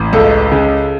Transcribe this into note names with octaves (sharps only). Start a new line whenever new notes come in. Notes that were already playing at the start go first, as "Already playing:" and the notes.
Already playing: A1
C#2 A4
C#3